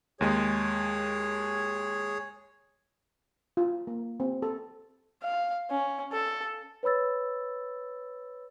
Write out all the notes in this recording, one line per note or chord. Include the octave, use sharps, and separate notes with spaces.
D#2 G#3 G#4 C#5
F4
A#3
C4
A4
F5
C#4
A4
B4 C#5 B5 E6 A6